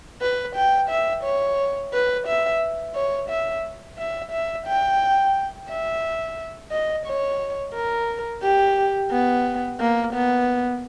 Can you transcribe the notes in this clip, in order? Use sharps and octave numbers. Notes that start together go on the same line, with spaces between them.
B4
G5
E5
C#5
B4
E5
C#5
E5
E5
E5
G5
E5
D#5
C#5
A#4
G4
B3
A#3
B3